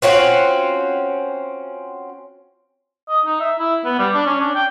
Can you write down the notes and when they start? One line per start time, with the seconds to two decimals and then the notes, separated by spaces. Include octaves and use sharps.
0.02 C4 C#4 F4 F#4
3.09 D#5
3.26 D#4
3.40 E5
3.59 E4
3.85 B3
3.99 G3
4.14 D4
4.26 C#4
4.40 D4
4.55 G5